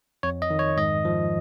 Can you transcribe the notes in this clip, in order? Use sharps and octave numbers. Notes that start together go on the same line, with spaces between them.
F2 C#5
D#5
D#3
C#5
G#2 D#5
F3